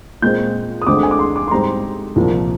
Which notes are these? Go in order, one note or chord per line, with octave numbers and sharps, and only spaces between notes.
A#2 G#3 C4 G6
D#6
D2 D3 G#3 C4 D6
G#5
D6
C6
D6
C6
G#2 G3 C4 A#5
C2 A#2 F3 A#3